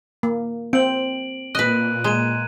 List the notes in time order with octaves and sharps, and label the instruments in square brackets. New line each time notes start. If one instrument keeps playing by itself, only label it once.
[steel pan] A#3
[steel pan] C4 [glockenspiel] D7 F#7
[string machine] A#2 [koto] B4 D#5 [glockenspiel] F#6 D#7
[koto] G#3 [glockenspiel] A#5 G#6 D#7